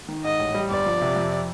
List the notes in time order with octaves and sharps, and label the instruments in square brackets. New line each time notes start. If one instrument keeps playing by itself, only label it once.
[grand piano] D#3
[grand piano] G#2 [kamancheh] D#5
[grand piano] A1
G3
[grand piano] G1 [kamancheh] D5
[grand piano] F3
C3
F2